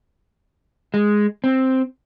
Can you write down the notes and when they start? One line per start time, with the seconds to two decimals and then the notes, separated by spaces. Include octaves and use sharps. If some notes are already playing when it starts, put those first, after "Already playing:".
0.94 G#3
1.44 C4